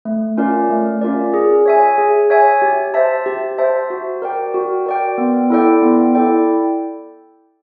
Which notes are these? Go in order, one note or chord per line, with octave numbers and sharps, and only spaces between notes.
A3
C#4 F4 A#4 D5
A3
C#4 F4 A#4 D5
G#4
C#5 E5 G#5
G#4
C#5 E5 G#5
G4
C5 E5 A5
G4
C5 E5 A5
F#4
A#4 D5 G5
F#4
A#4 D5 G5
B3
E4 A4 D5 G5
B3
E4 A4 D5 G5